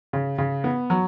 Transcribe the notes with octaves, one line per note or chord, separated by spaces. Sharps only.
C#3
C#3
B3
F#3